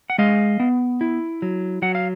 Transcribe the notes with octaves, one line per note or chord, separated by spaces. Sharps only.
F#5
G#3 D#5 F5
B3
E4
F#3
F#3 F#5
F5